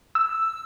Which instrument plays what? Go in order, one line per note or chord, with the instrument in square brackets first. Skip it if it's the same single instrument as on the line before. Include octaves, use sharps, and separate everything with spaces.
[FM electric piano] E6